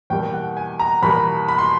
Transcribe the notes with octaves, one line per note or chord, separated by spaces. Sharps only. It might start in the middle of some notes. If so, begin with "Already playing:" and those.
E2 B2 G3 A#3 G5
F#5
G#5
A#5
E2 B2 G3 A#3 B5
B5
C6